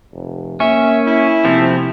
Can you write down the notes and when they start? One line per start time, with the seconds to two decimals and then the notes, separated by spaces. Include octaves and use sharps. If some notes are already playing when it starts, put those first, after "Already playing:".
0.13 F1
0.60 A#3 C#4 E5
1.06 E4
1.45 C3 F3 A3 C4